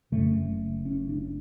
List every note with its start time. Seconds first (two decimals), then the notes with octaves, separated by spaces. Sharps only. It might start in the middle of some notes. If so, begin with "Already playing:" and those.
0.12 F#1 F#2 C#3 A3
0.85 C#4
1.09 D4